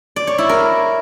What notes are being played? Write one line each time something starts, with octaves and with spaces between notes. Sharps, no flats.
D5
C#5
E4
A#4